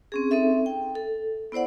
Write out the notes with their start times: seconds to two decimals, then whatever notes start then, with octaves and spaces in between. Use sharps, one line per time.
0.12 C4 C#4 G#4
0.31 C4 D#4 A4 E5
0.66 G5
0.95 A4
1.52 B3 E4 C5 D5 F#5